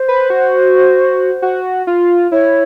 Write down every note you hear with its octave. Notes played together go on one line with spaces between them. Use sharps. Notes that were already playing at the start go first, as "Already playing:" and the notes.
Already playing: C5
B4
F#4
F#4
F4
E4 C#5